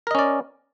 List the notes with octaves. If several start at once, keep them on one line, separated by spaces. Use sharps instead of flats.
C#4 A#4 D5 D#5